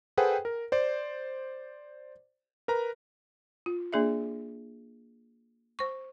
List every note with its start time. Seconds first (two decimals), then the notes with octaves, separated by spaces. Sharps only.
0.17 G#4 A4 B4 C5 F#5 G5
0.45 A#4
0.72 C5 D5
2.68 A#4 B4 A#5
3.66 F4
3.93 A#3 D4 G#4 D5 E5
5.79 C5 C#6